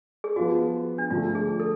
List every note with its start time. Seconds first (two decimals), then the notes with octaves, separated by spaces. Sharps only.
0.24 G#4
0.36 F3 B3 F4 F#4 G#4
0.98 D4
1.11 D3 F3 A3 F4
1.35 G#4
1.60 A4